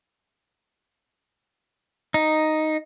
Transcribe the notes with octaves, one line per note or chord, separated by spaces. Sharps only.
D#4